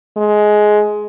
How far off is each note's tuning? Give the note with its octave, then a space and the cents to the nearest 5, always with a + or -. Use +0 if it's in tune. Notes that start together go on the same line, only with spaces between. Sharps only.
G#3 +15